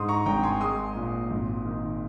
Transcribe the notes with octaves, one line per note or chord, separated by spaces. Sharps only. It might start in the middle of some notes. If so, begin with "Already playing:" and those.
Already playing: G#2 C6 D#6
A#5 C#6
G#1 G5 A#5
G#5 C6
G#3 C6 D#6
A#2
G#1
D#3